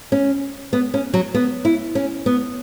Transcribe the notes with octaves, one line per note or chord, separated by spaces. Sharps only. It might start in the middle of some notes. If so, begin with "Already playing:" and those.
C#4
B3
C#4
F#3
B3
E4
C#4
B3